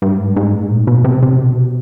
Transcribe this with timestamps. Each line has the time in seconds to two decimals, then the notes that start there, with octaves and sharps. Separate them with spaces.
0.02 G2
0.19 G#2
0.36 G#2
0.54 A2
0.70 A#2
0.87 B2
1.04 C3
1.23 C3
1.39 B2